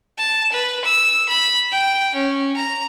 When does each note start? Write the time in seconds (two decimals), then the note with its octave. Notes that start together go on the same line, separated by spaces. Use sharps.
0.18 A5
0.52 B4
0.85 E6
1.29 B5
1.72 G5
2.15 C#4
2.56 A#5